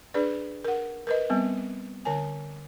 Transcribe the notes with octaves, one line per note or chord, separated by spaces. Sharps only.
D4 G#4 B4 D5
A#4 F#5
A#4 B4 D#5
G3 B3 C4
D3 C#5 G#5